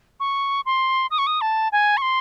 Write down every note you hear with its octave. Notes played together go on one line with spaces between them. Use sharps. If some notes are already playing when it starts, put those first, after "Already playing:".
C#6
C6
D#6
C#6
D#6
A5
G#5
C#6
C6